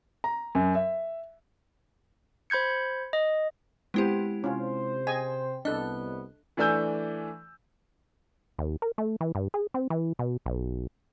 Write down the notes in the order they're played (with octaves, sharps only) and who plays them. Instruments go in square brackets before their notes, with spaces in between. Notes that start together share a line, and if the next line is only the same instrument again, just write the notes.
[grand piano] A#5
F#2
E5
[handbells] C5 B5 G6 G#6 C#7
D#5
[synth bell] G#3 E4 G4 [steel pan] B3 C4 C5
[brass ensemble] C3 C5 [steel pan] C#4 F4
[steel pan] G#4 D#5 G#5 [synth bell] G5
[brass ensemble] C2 B3 [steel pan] D4 A4 [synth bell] D#5 F#6
[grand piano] E3 A3 D4 G#5 E6 G6
[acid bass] D#2
A#4
A3
E3
G2
G#4
C4
E3
B2
B1